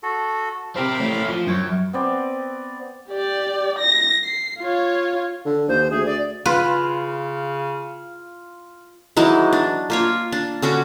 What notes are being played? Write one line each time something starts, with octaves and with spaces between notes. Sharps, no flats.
F#4 A4
C4 G4 A#4 F5 B5
A3 C#4
F3
F#2 C#5 G5
B3 C4 D5
G4 D5
A#6
C7
F4 C#5
D3
D#2 C5
D2 G#4
D5
C#3 F4 B4
E3 F#3 G#3 D#4
D4
A#3 F4 C#5
D4
D3 C#4 F#4 D6